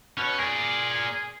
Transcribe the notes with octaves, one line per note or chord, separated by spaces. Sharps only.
B2 C#4 C#5
G#4 A#4 D5